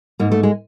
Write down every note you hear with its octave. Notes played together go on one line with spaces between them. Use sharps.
G#2 A#3
A3
G#3